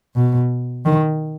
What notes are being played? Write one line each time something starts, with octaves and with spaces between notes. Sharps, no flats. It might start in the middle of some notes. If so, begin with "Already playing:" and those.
B2
D#3